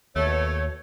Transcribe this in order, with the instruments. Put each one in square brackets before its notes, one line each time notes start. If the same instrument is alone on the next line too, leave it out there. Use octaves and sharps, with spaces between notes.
[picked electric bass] D#2 [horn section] B2 A3 [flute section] C#5